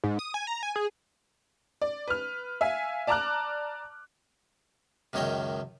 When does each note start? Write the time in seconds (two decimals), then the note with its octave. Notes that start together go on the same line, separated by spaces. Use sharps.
0.04 G#2
0.19 D#6
0.34 G#5
0.47 A#5
0.63 G#5
0.76 G#4
1.82 D5
2.08 B4 F6
2.61 E5 F5 G#5
3.07 D5 A5 A#5 D6 F6 F#6
5.13 C#2 F#2 D#3 C#5 D#5 G5